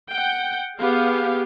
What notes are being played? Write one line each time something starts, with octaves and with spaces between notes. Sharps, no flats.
F#5 G5
B3 G4 G#4 F5